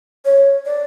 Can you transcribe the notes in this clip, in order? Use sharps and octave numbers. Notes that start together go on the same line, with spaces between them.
C#5
D5